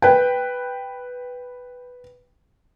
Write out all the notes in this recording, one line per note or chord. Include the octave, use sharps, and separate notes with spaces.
B4 G5